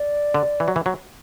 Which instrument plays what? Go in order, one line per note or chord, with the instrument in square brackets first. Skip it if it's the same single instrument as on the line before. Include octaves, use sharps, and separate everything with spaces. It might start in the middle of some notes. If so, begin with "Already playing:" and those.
Already playing: [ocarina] D5
[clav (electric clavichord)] D3
E3
F#3
E3
F#3